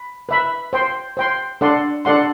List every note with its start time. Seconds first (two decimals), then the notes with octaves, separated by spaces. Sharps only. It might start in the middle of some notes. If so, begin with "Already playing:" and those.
Already playing: B5
0.29 B4 E5 B5
0.73 C5 G5 C6
1.17 C5 G5 C6
1.61 D4 A4 D5 F#5 C6
2.05 D4 A4 D5 F#5 C6